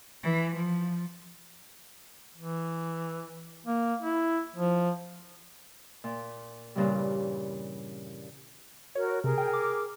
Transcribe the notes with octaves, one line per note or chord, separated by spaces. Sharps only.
E3
F3
E3
A#3
E4
F3
A#2
G2 A#2 C#3 E3 G3
F#4 A#4 C#5
C3 G#4 A#4
G5
D6